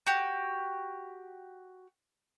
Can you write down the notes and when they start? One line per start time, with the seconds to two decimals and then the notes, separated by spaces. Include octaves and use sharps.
0.07 F#4 G4